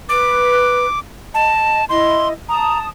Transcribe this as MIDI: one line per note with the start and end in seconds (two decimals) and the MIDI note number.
0.09 0.86 71
0.09 0.99 86
1.34 1.81 75
1.34 1.85 81
1.89 2.30 64
1.89 2.30 75
1.89 2.28 84
2.49 2.87 81
2.49 2.79 82
2.49 2.87 87